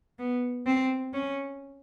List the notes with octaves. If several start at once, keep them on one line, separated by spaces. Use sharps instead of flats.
B3
C4
C#4